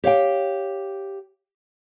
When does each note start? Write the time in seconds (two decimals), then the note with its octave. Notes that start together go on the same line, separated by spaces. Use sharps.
0.04 G4 C#5 F5 G5